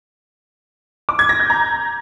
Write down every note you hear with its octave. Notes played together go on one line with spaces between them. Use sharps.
D6
G#6
A#6
G6
A#5